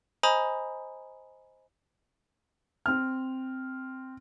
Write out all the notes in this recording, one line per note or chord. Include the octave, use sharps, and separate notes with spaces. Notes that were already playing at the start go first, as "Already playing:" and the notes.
C5 D#5 G#5 A#5 B5 D#6
C4 F6